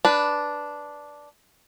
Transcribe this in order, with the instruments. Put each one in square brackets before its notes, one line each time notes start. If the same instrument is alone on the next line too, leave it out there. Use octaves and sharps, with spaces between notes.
[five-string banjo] D4 B4